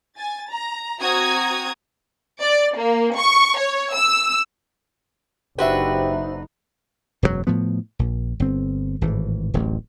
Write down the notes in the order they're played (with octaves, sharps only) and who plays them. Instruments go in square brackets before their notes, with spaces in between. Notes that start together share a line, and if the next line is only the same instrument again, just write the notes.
[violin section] G#5 A6
A#5
C4 F#4 A#5 D#6 G#6
D5
A#3
C#6
C#5
E6
[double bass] F#1 D#4 [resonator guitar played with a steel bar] D4 F#4 B4 [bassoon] G4 [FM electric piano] C5 E5
[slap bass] E1 F#2 A2 F#3
A2 F3 B3
A#1
G1 C4
G#1 A2 E3
D1 A1 D2